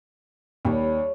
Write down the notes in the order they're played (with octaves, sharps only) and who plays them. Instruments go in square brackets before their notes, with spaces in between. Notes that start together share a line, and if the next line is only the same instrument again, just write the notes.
[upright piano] D#2 [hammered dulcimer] G3 C#5